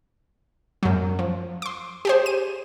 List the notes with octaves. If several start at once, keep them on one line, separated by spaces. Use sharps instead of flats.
F#2 F#3
F3
C6 D6
G4 G#4 C5
D#7